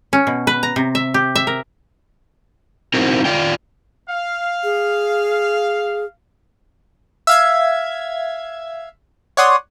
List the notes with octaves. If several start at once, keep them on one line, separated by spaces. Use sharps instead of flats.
C#4
B2
B4
A#5
C3
E5
G4
E5
A#4
C4 D#4 E4 F#4 A#4 C5
F4 D5 G5
F5
G#4
E5 F5 G#6
C#5 D5 F#5 C6 D#6